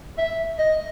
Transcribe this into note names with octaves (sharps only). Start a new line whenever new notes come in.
E5
D#5